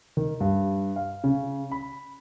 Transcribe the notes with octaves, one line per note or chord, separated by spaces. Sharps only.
D#3
G2
F5
C#3
B5